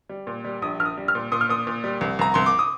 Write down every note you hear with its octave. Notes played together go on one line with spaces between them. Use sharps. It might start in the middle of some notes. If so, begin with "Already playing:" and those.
G3
A#2
G3
A#1 D#6
A#1 F6
D#6
G3
F6
A#2
A#2 D#6
F6
A#2 D#6
A#2
G3
C2
C2 A#5
C2 C6
D6
D#6